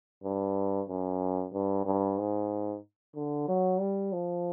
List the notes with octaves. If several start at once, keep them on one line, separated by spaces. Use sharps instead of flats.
G2
F#2
G2
G2
G#2
D3
F#3
G3
F3